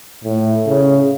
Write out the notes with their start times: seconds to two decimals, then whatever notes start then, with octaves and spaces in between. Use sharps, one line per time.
0.24 A2
0.66 C#3